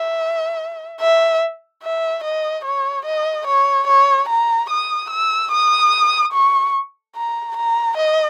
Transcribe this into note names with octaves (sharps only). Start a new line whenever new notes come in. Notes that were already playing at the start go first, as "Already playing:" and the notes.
Already playing: E5
E5
E5
D#5
C#5
D#5
C#5
C#5
A#5
D#6
E6
D#6
C#6
A#5
A#5
D#5